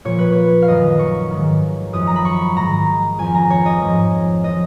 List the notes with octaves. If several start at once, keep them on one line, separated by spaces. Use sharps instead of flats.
A#2 F3 C#5
B4
C#5
F5
F#2 D#3 D#5
C#6
G#2 D#3
F#2 F3 D#6
A#5
B5
C#6
G#2 D#3 A#5
F2 F3 G#5
A#5
C#5
D#5
G#2 F3
F3 D#5